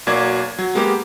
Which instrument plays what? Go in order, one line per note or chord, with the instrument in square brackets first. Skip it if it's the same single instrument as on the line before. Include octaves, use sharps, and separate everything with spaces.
[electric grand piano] B1 F#3 A#3 D5 G#6
F#3
G#3 A#3 B3 G4